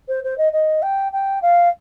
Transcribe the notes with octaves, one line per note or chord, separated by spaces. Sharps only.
C5
C5
D#5
D#5
G5
G5
F5